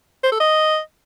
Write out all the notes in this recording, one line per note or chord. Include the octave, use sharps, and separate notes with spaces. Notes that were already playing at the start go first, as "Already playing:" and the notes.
C5
A4
D#5